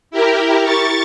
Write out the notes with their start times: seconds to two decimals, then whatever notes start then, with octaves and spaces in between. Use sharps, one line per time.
0.11 E4 G4 A#4
0.63 C#6 A6